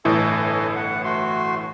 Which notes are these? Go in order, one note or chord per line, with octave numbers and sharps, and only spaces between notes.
G1 A2 E3 A4 D#5 G#5
F#5
A3 F#4 C6